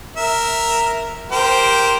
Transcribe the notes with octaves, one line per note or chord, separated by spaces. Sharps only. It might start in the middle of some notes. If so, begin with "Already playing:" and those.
A#4 E5
G4 A#4 C5